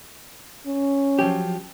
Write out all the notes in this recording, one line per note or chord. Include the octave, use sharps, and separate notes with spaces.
C#4
F3 F#3 G4